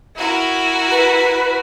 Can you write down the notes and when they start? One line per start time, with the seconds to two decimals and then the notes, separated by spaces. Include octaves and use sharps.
0.16 E4 F#4 A#4
0.91 B4